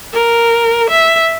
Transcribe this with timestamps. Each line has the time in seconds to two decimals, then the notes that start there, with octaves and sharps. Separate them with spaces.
0.13 A#4
0.90 E5